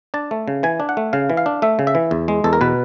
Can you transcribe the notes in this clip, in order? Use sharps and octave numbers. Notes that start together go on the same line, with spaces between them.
D4 A5
A3
C#3
E3 G#5
D4
F#5
A3
C#3 F5
E3
F5
D4
A3 E5
C#3
E5
E3
E2
G#3
E2 A4
A#4
B2 B4